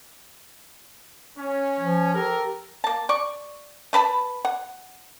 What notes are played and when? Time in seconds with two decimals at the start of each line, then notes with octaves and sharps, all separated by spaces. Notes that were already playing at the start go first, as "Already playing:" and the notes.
1.38 C#4
1.80 F3
2.14 G4 A4 A#4
2.84 A#3 A5
3.09 D5 C#6
3.93 A3 B4 A5 B5
4.45 F#5